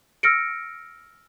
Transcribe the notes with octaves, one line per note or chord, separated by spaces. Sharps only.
E6 F6 A#6 C#7 D7